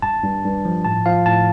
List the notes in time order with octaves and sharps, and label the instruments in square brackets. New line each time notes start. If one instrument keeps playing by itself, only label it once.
[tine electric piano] G2 A5
G2
G2
F3
A2 A5
F3 F5
A2 A5